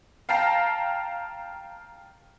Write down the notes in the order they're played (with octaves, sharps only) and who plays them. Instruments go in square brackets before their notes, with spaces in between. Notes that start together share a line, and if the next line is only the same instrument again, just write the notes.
[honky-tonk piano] F5 G5 A5 A#5 C7